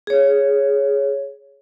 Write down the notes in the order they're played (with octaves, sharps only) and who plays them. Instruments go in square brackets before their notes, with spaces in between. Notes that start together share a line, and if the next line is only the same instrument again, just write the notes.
[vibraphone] G#4 C#5